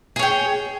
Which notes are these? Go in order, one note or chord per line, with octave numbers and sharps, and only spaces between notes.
G#4 C#5 G5